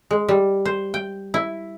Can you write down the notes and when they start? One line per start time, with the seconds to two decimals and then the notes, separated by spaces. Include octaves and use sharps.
0.11 G#3
0.29 G3
0.65 C5
0.94 G5
1.34 E4